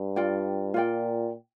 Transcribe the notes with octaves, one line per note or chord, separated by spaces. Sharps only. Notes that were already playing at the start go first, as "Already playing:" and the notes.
Already playing: G2
F4 D5 G5
A#2 F4 D5 G5